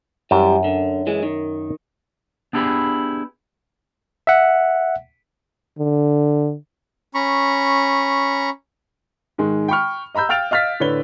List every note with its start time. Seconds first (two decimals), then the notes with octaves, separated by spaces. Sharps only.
0.31 F#2 E3 G3
0.64 D3
1.07 E3 G#3
1.23 D#3
2.53 B3 D4 E4 G4 G#4 B4
4.27 E5 F#5
5.78 D3
7.14 C#4 A#5 B5 C#6
9.38 G#2 D#3 G#3
9.68 G5 B5 C#6 F6
10.15 D#5 A#5 B5 E6 G6
10.29 F5 G5 F6 A6 D7 F7
10.51 D#5 F5 F6 A6 B6
10.80 A2 D3 B4 C#5 G7